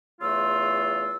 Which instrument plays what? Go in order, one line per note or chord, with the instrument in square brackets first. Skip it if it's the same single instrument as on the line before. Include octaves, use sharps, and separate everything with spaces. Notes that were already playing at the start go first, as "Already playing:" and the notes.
[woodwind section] E2 C#3 A3 F4 C6 E6